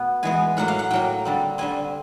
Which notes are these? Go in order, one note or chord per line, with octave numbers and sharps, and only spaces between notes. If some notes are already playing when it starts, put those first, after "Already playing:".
Already playing: B2 B3
E3 G#3 B3 G#5
A2 F#3 A#3 F#5
F5
F#5
A2 F#3 A#3 G5
D3 G3 C4
D3 G3 C4 G#5